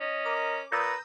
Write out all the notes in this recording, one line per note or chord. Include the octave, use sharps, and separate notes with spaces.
C#4 D#5
A#4 D6
A#2 B4 A#5 D#6 E6 G6